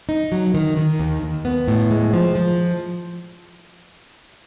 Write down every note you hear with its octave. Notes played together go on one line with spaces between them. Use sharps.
D#4
F#3
D#3
D#3
D#2
D#2
B3
A2
G#3
F3
F3